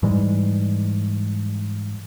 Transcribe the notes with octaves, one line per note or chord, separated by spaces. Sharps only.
G#2 E3 G3 G#3